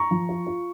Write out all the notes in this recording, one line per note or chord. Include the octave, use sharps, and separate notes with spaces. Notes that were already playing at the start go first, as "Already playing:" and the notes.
Already playing: A#5 C#6
F3
F4
F4